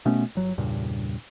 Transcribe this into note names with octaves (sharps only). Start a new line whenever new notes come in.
B2 A3 B3 C#4
G1 F#3
E2 G2 A#2 C#3